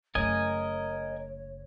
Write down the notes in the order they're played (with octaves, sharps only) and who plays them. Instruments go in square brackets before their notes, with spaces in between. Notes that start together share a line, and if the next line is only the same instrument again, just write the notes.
[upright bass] F#1 A3 [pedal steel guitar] A#4 D#5 G#5 [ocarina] C#5